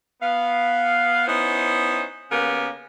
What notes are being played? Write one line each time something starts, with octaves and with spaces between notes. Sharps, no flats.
B3 F5
B3 C#4 D#4 E4 C5
C#3 A#3 B3 G4 A#4